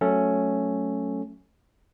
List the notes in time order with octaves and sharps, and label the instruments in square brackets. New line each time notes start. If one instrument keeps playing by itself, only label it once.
[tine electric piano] F#3 A3 C#4 A4